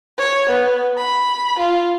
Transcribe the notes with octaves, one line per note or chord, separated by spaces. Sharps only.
C#5
B3
B5
F4